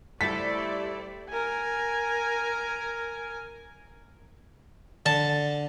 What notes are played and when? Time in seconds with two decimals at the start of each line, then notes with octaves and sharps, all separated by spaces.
0.21 G3 A3 E4 A4 C5 D5 B6
1.30 A#4 G#5
5.06 D3 A5